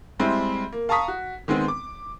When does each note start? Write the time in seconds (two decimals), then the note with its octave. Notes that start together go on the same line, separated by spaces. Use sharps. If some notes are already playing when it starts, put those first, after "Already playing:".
0.19 G3 G#3 C4 E4
0.72 A#3
0.89 F5 A5 A#5 C#6 D#6 B6
1.08 F#4
1.48 D#3 G#3 B3 C4
1.68 D6